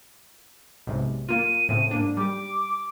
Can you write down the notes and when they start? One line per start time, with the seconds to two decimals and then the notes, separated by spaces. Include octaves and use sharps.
0.87 B1 G#2 C3
1.29 A#3 F4 D#7
1.69 A2 C#3 C4
1.91 G#2 A#3 D4
2.17 G3 G4 D6